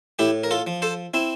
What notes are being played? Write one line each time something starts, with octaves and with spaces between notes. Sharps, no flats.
A2 E4 G4
A#4
F4 A4
F3
A4 C5
C4 E4